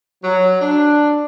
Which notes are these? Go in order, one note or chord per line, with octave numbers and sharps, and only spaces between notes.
F#3
D4